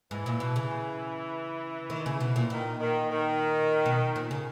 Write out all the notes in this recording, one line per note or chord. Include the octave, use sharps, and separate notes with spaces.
G#2 E3
A#2
B2
C#3
D#3
C#3
B2
A#2
A#2 D#3
D#3
D#3
B2
A#2
C#3